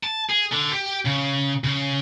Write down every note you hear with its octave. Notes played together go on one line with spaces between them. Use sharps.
A5
G#4
D3
G4
C#3
C#3